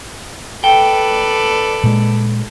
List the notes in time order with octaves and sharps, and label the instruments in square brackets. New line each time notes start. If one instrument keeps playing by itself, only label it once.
[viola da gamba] A4 B4 D5 [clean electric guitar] G5
[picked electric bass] A#2 G#3